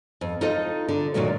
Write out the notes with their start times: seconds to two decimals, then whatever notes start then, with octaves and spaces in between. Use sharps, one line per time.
0.21 F2
0.41 D#4 F4 A4 D#5
0.89 D3
1.14 A#2 D3 D#3 F#3 A3